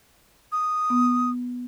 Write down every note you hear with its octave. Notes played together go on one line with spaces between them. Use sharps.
D#6
B3